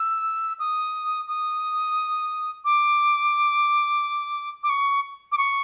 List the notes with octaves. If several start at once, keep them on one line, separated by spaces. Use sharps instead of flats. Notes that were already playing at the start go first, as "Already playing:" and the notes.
Already playing: E6
D#6
D#6
D6
D6
C#6
D6
C#6